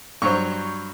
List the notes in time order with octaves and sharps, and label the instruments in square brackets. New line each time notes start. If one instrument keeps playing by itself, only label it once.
[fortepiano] G2 F#3 C5 [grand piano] C#6